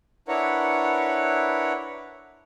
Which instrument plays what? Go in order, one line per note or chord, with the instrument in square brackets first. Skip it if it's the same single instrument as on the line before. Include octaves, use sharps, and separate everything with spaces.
[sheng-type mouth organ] D4 E4 A#4 B4 C#5 F#5